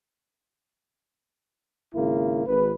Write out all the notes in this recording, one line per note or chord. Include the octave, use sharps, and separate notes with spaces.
G#1 C#3 A#3 E4
G#1 B4